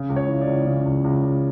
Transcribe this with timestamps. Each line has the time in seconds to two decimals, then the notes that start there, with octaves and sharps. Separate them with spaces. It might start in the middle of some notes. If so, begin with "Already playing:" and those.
Already playing: C#3
0.10 C#2
0.16 C#5
0.28 E3
0.41 D5
0.47 C#2
0.66 C#3
0.85 C#2
1.04 C#2
1.23 C#2